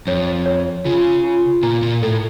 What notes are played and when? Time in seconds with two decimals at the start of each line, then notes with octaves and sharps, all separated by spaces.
0.07 F2 C#5
0.46 C#5
0.85 C#3 F4
1.24 F4
1.63 A#2 A#5
1.83 A#2
2.02 A2 A4